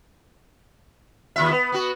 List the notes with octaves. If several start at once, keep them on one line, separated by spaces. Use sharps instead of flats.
D#2 F4 E5
B3
B3 F#4